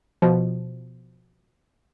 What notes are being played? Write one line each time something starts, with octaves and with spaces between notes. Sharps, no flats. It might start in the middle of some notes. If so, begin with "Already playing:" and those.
B2 F3